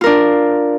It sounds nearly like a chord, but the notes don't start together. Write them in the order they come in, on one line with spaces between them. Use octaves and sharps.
F4 A#4 D4